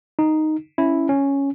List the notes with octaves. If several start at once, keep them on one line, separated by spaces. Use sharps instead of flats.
D#4
C#4 E4
C#4